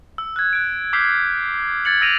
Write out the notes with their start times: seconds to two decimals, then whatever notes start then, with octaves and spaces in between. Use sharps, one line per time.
0.18 E6
0.36 F#6 G#6
0.53 F#6 D7
0.93 D6 E6 F6 G6 B6 C7
1.85 G#6 A6 C#7 F#7
2.01 E6 A#6 D7 D#7 F7